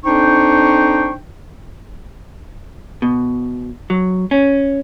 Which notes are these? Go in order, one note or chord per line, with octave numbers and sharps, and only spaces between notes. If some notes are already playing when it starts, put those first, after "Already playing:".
F2 D4 D#4 C5 G5 C#6
B2
F#3
C#4